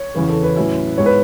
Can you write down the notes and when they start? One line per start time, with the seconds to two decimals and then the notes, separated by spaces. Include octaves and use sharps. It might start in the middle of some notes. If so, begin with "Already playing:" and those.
Already playing: C#5
0.15 E2 C#3 E3 B4
0.29 A4
0.43 B4
0.56 A2 F#3 C#4 E4
0.98 G#2 G#3 B3 E4 C#5
1.06 B4